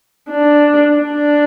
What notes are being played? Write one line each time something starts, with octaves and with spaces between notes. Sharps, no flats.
D4
D4